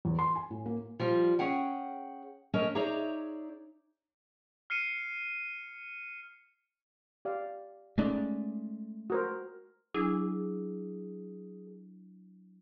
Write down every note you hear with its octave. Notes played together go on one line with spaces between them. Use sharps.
E2
C6
G#5
A2
A#3
F3 G3 F4
C#4 G#4 F#5 G5
A3 C#4 A#4 C#5 D#5
D#4 G#4 C#5 D5 E5 A#5
F6 C7 C#7 D#7
G4 D5 F5
G#3 A3 C#4 D#4 D5
F#4 A#4 C5
F#3 D4 E4 G#4